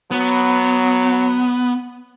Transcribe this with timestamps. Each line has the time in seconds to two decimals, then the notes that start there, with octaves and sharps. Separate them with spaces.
0.11 F#3 B3